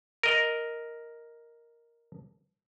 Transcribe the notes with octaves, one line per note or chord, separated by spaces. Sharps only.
A#4 D#5